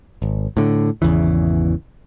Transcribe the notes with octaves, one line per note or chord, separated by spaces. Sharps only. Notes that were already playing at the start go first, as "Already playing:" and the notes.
G#1
A2 D3
G#1 E2 C#3 E3